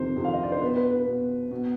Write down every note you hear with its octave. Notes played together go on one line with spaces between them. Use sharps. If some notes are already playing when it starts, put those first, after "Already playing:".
Already playing: F2 C3 D#3 C5
F2 C3 D#3
F5
D#5
D5
C5
B2 B4
B4
B4
B2
B2